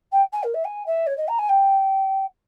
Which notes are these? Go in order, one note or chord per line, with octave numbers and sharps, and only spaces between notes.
G5
G#5
A#4
E5
G#5
E5
C#5
D#5
A#5
G#5
G5